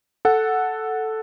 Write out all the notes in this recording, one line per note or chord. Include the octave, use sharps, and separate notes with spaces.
A4 F#5